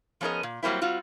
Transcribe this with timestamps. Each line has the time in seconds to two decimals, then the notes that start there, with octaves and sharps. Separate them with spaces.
0.21 F3 B3 C#4 G#4 A#4 D#5
0.43 A#2
0.63 F#3 G3 A#3 C4 E4
0.81 G3 C4 F4 F#4